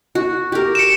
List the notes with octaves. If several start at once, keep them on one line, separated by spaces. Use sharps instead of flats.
F#4
G4 A#4
C#7 D7 E7